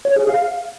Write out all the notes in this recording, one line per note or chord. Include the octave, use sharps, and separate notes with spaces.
C#5
G#4
F5